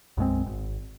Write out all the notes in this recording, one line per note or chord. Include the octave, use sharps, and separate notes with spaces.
B1 F#2 G#3 C4
G#1